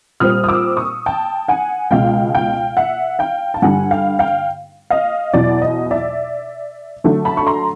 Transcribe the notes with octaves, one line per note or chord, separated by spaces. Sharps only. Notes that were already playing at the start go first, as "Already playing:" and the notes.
A#2 G3 C4 D#6 F6
D#6
D6 E6
C#6 D#6
G5 A5
F#5 G#5
C#2 B2 G#3 F5 G5
F5 G5
E5 F#5
F5 G5
A5
G2 D3 G3 F#5 G#5
F5 G5
F5 G5
D#5 F5
E2 B2 F#3 D5
D#5
D5 E5
D3 F#3 A3 D4
A5 B5
C#6
A#5 C6